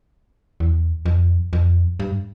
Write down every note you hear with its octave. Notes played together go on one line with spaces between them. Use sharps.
E2
F2
F2
G2